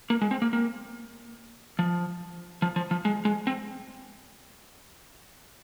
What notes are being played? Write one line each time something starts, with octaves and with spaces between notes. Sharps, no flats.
A#3
G#3
C4
A#3
A#3
F3
F3
F3
F3
G#3
G#3
C4